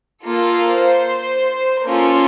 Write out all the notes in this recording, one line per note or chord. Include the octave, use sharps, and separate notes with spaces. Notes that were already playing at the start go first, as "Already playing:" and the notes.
A#3 F4 A4
C5
A#3 C#4 F4 A4 A#4